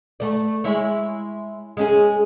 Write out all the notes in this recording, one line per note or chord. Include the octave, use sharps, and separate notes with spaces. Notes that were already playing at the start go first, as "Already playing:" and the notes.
A3 D5
G#3 E4 C#5
G#3 C#4 G#4